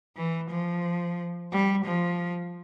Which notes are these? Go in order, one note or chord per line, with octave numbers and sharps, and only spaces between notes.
E3
F3
G3
F3